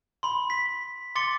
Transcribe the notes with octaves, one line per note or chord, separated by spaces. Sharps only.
B5 C6
B6
C6 D6 A6 C#7 G7